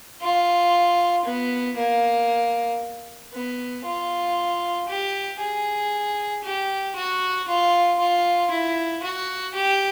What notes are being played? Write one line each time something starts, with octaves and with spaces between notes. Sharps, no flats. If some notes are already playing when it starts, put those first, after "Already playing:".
F4
B3
A#3
B3
F4
G4
G#4
G4
F#4
F4
F4
E4
F#4
G4